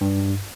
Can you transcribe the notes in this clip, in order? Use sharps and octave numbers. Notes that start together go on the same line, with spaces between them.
G2